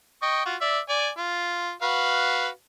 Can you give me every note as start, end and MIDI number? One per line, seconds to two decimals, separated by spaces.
0.22 0.42 75
0.22 0.42 79
0.22 0.42 85
0.46 0.56 65
0.46 0.56 66
0.61 0.79 74
0.61 0.79 76
0.89 1.09 74
0.89 1.09 80
1.17 1.72 65
1.82 2.48 66
1.82 2.48 71
1.82 2.48 77